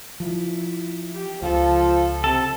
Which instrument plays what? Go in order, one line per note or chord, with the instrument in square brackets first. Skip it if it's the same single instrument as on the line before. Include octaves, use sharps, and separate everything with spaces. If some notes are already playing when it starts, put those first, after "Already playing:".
[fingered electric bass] F3 [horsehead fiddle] E4
[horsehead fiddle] G4
[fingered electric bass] C#2 [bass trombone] F3 [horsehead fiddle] A4
[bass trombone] C3 [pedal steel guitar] A4